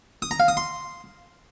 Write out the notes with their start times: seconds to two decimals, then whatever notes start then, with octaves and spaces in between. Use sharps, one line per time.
0.22 D#6
0.31 A#5
0.40 F5
0.48 D#6
0.57 C6